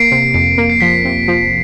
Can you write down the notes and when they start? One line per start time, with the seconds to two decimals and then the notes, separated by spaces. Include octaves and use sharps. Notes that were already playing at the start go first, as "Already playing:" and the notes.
Already playing: A#3 C7 D7
0.11 C3
0.34 F2 C7
0.58 A#3
0.70 C7
0.81 F3 B6
1.05 C3
1.28 F3